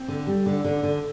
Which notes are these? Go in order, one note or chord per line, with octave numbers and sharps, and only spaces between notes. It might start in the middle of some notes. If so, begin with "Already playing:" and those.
Already playing: C4
D3
G3
D3
D3
D3